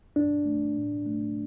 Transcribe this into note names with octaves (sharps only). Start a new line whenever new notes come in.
G2 D4
A3
A2
A3